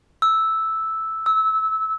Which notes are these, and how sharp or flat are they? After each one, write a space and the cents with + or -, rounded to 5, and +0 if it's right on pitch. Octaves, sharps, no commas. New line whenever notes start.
E6 -5
E6 -20